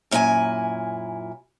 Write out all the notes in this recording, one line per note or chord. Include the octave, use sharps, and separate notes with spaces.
F#2 A#2 E4 G4 G#5